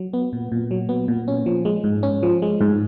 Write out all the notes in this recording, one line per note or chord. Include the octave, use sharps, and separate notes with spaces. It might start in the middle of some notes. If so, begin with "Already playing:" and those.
Already playing: F#3
B3
A#2
A#2
F#3
B3
A#2
C#4
F3
G#3
G#2
C#4
F3
G#3
G#2